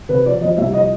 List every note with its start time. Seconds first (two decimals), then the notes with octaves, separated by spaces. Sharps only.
0.09 C3 B4
0.26 F3 D5
0.41 F2 D#5
0.57 C2 E5
0.73 F3 D#5